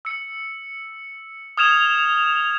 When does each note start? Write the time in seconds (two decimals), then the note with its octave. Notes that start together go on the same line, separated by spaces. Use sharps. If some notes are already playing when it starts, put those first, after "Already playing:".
0.05 E6 C#7
1.57 D#6 F6 G#6 E7 F7